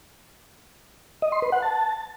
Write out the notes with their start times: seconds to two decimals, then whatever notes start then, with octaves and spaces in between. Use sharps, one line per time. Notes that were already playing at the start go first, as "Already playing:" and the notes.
1.22 D#5
1.32 C6
1.42 B4
1.52 F#5
1.62 A5